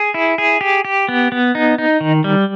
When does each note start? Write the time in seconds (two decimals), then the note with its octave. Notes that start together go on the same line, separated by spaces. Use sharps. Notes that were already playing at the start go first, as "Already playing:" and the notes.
Already playing: G#4
0.14 E4
0.38 G#4
0.61 G4
0.85 G4
1.09 B3
1.32 B3
1.55 D#4
1.78 D#4
2.01 D#3
2.24 G3